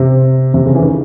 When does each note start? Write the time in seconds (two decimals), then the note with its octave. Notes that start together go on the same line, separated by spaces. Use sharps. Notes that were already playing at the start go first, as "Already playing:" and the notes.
Already playing: C3
0.54 C3
0.66 C#3
0.75 E3
0.81 D#3